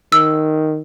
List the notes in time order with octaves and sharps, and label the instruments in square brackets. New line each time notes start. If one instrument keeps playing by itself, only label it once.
[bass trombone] D#3 [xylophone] E6